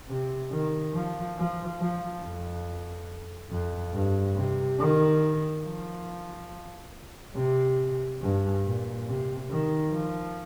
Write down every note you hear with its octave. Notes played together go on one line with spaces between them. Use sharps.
C3
D#3
F3
F3
F3
F2
F2
G2
C3
D#3
F3
C3
G2
A#2
C3
D#3
F3